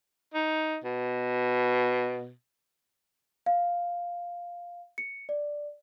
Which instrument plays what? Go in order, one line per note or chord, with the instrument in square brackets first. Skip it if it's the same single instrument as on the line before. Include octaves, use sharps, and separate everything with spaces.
[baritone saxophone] D#4
B2
[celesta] F5
C#7
D5